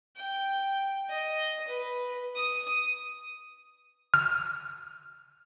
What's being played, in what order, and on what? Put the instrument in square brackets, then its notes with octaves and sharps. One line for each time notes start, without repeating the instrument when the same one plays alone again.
[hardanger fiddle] G5
D#5
B4
D#6
[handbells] F6